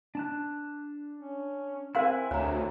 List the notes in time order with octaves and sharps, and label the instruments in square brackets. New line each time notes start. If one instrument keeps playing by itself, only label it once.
[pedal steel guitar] D4 A5 F#6
[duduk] C#4
[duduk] C4 [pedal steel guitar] E4 F#5 G#5 [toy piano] A#4 F5 C6
[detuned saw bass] D2 [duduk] C3 [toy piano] C#5 A#5